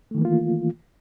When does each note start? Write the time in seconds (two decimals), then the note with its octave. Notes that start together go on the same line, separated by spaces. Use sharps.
0.11 A3
0.15 D#3
0.18 E3
0.22 A#3
0.25 F4